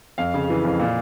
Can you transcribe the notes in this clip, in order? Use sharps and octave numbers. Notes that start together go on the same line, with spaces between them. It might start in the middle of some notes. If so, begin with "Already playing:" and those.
F2 F5
C#3
E3
F2
A#2